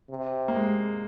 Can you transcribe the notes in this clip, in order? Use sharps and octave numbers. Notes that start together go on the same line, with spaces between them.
C3
A#3
G#3